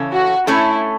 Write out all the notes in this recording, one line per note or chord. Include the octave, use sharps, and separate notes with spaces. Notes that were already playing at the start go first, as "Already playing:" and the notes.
Already playing: C#3 E3 C#4 A4 C#5
F#4
A3 C#4 E4 A4 C#5